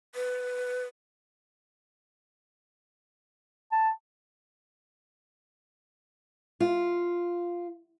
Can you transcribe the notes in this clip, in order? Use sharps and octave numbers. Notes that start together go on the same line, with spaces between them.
B4
A5
F4